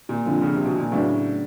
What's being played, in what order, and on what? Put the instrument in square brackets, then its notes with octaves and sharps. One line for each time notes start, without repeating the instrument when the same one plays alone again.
[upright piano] A#2
[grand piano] F2 D3 F3
[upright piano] C#3
C3
B2
A#2
[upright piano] A2 [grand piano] C#3 F#3 B3 D4